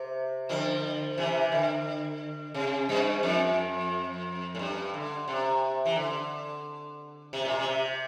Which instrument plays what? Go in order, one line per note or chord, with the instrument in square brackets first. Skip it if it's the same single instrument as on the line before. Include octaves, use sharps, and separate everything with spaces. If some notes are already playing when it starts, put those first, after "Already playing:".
Already playing: [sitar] C3
D3 F3
C3 E3
D3
C3
G2
F2
A2
G2
D3
C3
E3
D3
C3
A#2
C3